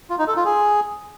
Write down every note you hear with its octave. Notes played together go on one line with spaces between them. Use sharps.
F4
D#4
A4
F4
G#4